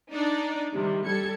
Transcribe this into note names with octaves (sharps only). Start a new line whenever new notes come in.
D4 D#4 D5
C3 D#3 G3
G3 A4 G#6 C#7